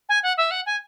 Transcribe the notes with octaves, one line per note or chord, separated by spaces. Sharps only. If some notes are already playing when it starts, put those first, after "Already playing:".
G#5
F#5
E5
F#5
G#5